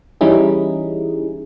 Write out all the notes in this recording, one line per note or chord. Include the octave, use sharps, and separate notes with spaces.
E3 G3 C#4 D#4 E4 G#4